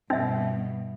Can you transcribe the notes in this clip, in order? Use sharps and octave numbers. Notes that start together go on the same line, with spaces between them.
G2 B2 C4 D#4 E5